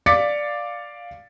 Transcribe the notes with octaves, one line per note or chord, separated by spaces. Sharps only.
D5 F5 D6 A6 B6 C#7